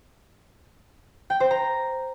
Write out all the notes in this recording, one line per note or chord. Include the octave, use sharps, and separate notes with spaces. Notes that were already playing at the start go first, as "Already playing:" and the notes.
G5
C5
A#5